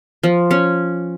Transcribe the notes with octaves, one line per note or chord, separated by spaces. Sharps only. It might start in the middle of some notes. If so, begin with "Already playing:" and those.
F3
C#4